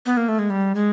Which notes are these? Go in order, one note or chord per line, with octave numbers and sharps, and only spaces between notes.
B3
A#3
A3
G#3
G3
G#3